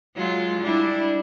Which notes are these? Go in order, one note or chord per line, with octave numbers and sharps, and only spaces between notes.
F#3 G#3 F4
G3 D4 E4